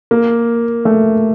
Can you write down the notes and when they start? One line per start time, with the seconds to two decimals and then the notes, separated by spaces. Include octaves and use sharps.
0.11 A#3
0.85 A3